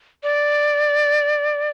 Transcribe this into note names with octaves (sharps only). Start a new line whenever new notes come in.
D5